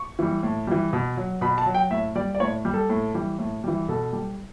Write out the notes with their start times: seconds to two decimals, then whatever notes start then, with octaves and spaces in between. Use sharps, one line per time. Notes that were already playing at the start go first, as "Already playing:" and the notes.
Already playing: C#6
0.19 E3 G3
0.43 A2
0.67 E3 G3
0.93 B2
1.17 F#3
1.41 B2 B5
1.58 A5
1.66 F#3
1.75 G5
1.90 A2 E5
2.16 G3 D5
2.34 D5
2.40 A2 C#5
2.65 G3
2.74 A4
2.90 A2
3.14 E3 G3
3.39 A2
3.64 E3 G3
3.88 B2 A4
4.13 G3